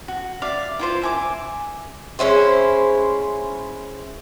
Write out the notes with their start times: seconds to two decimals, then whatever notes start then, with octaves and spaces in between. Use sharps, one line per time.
0.08 F#4
0.42 D5 E5 F5 D6
0.79 E4 F4 C5
1.02 E5 G#5 D6
2.19 G#3 C#4 E4 C5